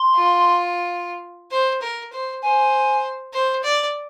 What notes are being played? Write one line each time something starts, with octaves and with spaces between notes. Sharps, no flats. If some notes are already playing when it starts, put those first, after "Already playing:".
Already playing: C6
F4
C5
A#4
C5
C5 G#5
C5
D5